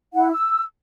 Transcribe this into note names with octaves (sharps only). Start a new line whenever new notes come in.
E4 F#5
E6